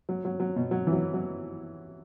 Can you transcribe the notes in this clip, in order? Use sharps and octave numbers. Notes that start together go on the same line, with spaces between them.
F#3
F#3
F#3
B2
F#3
E3
F#3
F#3